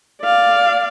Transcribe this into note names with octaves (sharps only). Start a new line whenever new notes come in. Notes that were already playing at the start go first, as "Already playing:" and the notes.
D5 F5